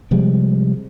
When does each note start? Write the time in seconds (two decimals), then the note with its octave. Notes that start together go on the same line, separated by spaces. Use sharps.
0.11 C3 F3 G3 G#3